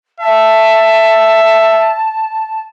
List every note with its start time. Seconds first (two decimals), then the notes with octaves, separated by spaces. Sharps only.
0.20 E5 A5